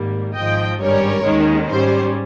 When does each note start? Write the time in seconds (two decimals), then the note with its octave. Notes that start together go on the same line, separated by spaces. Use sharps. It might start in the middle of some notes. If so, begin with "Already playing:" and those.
Already playing: G#1 G#2 G3 A#3
0.34 G#1 G#2 F3 D#5 G5
0.79 G#1 G2 G3 C#4 A#4 C#5
1.23 D#2 D#3 G#3 C#4
1.67 G#2 G3 C#4 C5